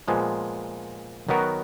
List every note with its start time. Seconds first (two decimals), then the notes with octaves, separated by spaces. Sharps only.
0.08 A#2 F3 G#3 B3
1.29 D#3 F#3 B3 F#4 A#4